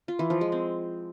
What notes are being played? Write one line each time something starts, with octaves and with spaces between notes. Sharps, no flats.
F4
E3
F3
G#3
C4